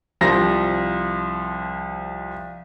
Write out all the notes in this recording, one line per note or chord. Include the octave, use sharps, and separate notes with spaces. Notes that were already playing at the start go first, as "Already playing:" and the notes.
C2 F3 A#6